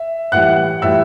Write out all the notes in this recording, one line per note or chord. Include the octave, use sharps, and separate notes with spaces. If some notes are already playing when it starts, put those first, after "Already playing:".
Already playing: E5
A2 E3 G3 F#5 F#6
A2 E3 G3 E5 E6